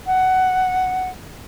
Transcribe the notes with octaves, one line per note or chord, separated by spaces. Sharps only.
F#5